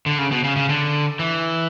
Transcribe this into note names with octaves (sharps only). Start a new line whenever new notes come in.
D3
C#3
B2
C#3
C#3
D3
E3